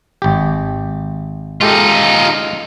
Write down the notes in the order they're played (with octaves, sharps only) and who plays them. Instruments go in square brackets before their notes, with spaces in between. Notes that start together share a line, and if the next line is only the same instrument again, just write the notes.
[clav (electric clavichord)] G#1 G4
[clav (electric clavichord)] G#3 G4 A4 [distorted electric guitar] D#4 F4